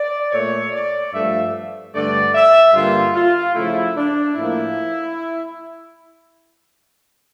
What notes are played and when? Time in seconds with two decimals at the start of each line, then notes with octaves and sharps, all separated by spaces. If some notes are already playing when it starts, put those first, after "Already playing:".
Already playing: D5
0.32 A#2 A3 C#5
0.72 D5
1.13 G2 F3 A3 E5
1.94 G2 D3 A3 D5
2.34 E5
2.73 G2 D3 G3 A#3 F4
3.14 F4
3.54 C#3 F3 A3 E4
3.95 D4
4.35 A2 F3 A#3 E4